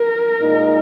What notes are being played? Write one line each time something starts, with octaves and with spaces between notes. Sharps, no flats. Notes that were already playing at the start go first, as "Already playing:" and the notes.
Already playing: A#4
A#2 G#3 D#4